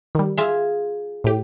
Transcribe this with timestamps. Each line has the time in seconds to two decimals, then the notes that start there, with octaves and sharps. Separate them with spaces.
0.15 D#3 G3
0.38 F4 G#4 E5
1.24 A2 G4